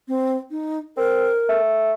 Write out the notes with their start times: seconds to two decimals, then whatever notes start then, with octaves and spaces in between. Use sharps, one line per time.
0.08 C4
0.51 D#4
0.97 C4 A#4
1.49 A3